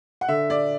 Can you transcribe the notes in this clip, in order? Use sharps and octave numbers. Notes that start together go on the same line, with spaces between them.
F#5
D3 E5
D5